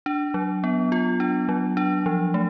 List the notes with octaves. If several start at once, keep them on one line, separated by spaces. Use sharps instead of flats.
D4
F#3
B3
F4
D4
F#3
D4
F3
A3